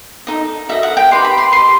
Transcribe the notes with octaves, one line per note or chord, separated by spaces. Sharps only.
D#4 A4 D#5
F#4 A4 D#5 E5
F#5
G5
D#4 G4 B4 D#5 C6
B5
C6
G4 D#5 C6